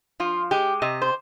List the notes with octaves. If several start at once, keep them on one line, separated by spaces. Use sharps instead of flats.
F3 F4
G#3 G4
C3 D#5
C5